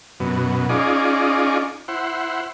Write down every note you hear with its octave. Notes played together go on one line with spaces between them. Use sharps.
F#2 B2
C#4 D#4 F4 G#4 D5
E4 C5 F#5